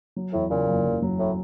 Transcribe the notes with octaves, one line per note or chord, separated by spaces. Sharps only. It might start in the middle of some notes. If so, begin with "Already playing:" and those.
F#3
E2 A2
A#2 C#3
F#1
F#1
F#3
A2